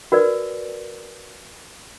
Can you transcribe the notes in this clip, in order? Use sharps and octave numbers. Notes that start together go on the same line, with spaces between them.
F#4 A#4 B4 D5